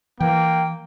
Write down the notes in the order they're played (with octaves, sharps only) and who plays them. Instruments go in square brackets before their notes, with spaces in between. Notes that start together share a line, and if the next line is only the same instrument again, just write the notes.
[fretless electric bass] E3 [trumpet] A#3 [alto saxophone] G5